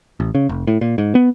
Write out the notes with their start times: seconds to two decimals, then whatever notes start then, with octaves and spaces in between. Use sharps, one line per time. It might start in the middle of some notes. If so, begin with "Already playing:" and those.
0.20 A1
0.35 C#3
0.49 F1
0.67 A2
0.81 A#2
0.98 G#2
1.15 B3